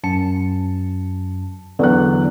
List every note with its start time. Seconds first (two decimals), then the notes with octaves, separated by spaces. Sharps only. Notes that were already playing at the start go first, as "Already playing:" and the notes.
0.04 F#2 A5 C#7
1.79 E2 D3 F#3 F#6